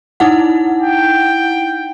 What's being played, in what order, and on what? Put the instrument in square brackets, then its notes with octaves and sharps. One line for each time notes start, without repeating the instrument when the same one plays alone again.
[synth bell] D#4 E4 F#5
[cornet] G5